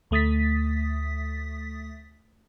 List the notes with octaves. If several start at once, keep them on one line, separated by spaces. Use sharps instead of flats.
D2 A3 D#6 A6 B6